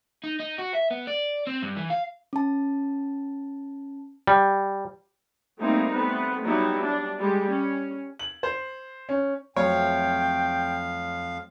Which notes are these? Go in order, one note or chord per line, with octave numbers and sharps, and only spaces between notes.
D#4
D#4
F#4
E5
B3
D5
C4
G2
E3
F5
C#4 A5
G3
G3 A3 A#3 C4 D#4 E4
A3 B3 C4 B4
F#3 G3 B3 D#4 E4
D4
G3 G#3 G4
C#4
F#7
C5
C#4
F2 F#3 A3 C4 C#5 F5 G5